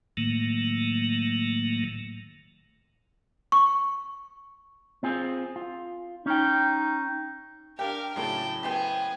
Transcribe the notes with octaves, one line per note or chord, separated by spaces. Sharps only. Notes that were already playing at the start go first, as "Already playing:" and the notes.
A2 D#3 F#3 A3 A#3
C#6
C4 F4 G#4
F4
C#4 D#4 G5
D4 G4 A#4 F5 G5
A2 C#3 F#3 F4 D5 G5 A5
B3 G4 G#4 C5 G5